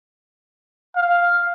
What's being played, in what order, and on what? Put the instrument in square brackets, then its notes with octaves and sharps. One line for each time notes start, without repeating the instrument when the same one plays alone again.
[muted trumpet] F5